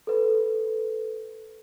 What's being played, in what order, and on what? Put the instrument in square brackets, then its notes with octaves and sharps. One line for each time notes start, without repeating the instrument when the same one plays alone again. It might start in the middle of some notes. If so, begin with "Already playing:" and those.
[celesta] A4 B4